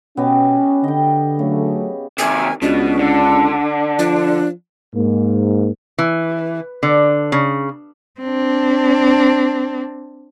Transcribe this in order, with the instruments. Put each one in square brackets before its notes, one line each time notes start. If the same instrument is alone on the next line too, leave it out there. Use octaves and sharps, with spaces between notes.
[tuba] B2 [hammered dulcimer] B3 G4 D#5 [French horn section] C#4
[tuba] D3 [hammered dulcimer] D#5 G5
[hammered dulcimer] C#3 [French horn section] F#3 A3
[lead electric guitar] C3 D#3 [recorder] G#5
[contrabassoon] C#2 [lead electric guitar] B2 [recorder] D4
[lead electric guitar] D3
[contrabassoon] F3 [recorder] D4
[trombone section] G#2 A#3
[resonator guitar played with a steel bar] E3
D3
C#3
[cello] C4 D4